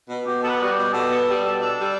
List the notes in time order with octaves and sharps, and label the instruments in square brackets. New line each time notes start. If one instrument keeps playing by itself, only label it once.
[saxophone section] B2
[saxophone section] B2 [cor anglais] G4
[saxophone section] B3 [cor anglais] A4
[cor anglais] B4
[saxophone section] G3 [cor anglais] F#4
[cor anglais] G4
[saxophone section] B2
[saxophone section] B2 [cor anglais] A4
[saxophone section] B3
G3
B2
D4
G3